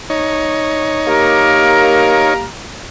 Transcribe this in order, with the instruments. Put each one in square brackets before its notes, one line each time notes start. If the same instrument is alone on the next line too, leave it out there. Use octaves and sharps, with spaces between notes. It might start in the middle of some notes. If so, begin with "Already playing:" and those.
[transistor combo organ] D#4 C#5
[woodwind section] A#3 G4 A#4